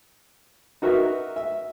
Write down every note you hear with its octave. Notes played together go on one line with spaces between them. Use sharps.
D#4 F#4 A#4 B4 E5
E5